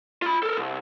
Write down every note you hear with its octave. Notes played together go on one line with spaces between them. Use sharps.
F4 B5
A4 A#4
C2